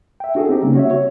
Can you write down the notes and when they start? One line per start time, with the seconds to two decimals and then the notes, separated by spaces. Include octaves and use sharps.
0.20 E5 G5
0.35 D4 F#4 G#4 A4
0.49 C4 D#4 G4
0.62 C#3 G3 A#3 C#4
0.75 F#4 C#5 E5
0.91 C#5